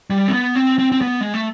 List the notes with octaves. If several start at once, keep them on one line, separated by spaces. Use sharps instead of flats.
G3
C4
B3
C4
C4
C4
B3
G#3
A3